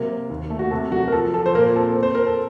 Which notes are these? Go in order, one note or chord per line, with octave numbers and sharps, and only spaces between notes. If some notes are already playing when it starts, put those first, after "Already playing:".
Already playing: C3 F#3 A#3 A#4
C4
D#2
A3
F#4
C3 A4
F#3 F#4
A#4
F3 A4
F3 A4
C5
A#2 A#3 A#4
C4 A4
C4
C5
C4 A#4
A4